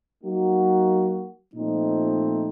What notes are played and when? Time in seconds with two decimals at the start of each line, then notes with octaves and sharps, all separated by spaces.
0.23 F#3 A#3 D#4 F#4
1.54 A#2 F3 A3 C4 D#4